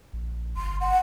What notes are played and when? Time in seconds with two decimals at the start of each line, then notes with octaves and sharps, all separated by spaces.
0.13 A#1
0.57 G1 C6
0.81 F#5